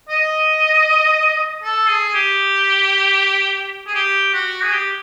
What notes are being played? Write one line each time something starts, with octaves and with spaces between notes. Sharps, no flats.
D#5
A4
G#4
G4
G#4
G4
F#4
G#4
G4